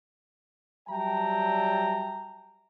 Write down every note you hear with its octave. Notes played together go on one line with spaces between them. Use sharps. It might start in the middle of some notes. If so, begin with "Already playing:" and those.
F#3 G3 E5 G5 A5 A#5